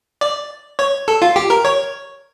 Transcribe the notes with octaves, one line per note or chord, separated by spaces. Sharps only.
D5
C#5
A4
F4
G4
A#4
C#5